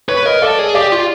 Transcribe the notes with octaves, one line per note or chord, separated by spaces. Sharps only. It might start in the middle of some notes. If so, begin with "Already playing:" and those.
B4 C#5
A#4 D#5
A4 D5
G#4
G4 D5
F4